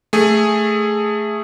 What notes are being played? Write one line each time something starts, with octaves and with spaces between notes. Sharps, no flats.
A3 G#4